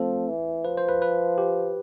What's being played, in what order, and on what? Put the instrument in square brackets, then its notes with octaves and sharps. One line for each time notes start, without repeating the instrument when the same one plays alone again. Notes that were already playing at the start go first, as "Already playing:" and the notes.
Already playing: [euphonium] F3 [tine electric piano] A3 C4 A4
[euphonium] E3
[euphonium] F3 [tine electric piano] B4
[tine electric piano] C5
B4
B4
G4